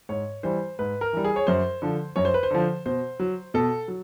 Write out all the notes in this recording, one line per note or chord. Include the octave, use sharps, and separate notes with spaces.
G#2 C#5
E3 G3 C5
G#2 B4
A#4
E3 G3
G#4
C#5
F#2 C5
D3 F3
F#2 C#5
C5
B4
C5
D3 F3
B2 C5
F#3
B2 A4
F#3